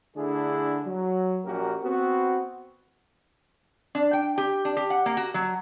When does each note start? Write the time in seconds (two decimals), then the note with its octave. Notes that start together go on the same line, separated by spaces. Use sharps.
0.17 D3 A3 D4 E4 G#4
0.86 F#3
1.45 A#1 A#3 C#4 F#4 G4 A#4
1.83 B3 C4 F#4
3.95 D4
4.13 G5
4.38 G4
4.65 D4
4.77 G4
4.90 F#5
5.06 A#3
5.17 F#4
5.34 F#3